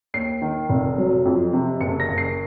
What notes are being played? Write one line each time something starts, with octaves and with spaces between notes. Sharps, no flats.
D#2 C7
D#3
F1
F#3
F2
C3
F#1 C#7
A#6
F#1
C7